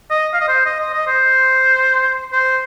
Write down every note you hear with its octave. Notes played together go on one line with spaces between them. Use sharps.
D#5
F5
D#5
C5
D#5
D#5
D#5
C5
C5